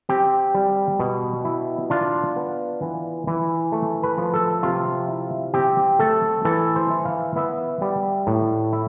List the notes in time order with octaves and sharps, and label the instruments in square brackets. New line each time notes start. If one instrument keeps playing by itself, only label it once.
[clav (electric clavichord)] C4 G4
G3
B2
E4
D4 F4
B3
E3
E3
A3
B4
F3
A4
C3 F4
E4
C4 G4
A3 A4
E3 A4
C5
E4
F5
B3 E5
G3
A2
E4